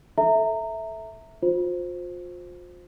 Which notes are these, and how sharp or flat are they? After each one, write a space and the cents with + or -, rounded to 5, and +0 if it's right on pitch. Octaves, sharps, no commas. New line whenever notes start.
A4 -10 E5 -5 A#5 -25
F4 +35 C5 +0